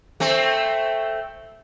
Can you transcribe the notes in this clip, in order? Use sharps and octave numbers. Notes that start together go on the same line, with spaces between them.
A3 C4